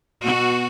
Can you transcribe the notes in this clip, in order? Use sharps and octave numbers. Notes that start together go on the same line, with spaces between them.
B2 F#4